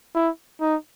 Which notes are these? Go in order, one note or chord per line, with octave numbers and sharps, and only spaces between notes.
E4
D#4